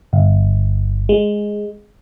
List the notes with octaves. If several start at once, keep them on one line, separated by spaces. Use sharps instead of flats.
G1
G#3